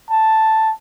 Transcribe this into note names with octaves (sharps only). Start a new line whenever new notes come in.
A5